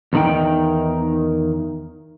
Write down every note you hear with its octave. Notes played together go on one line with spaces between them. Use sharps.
E2 A2 D#3 D#4 G5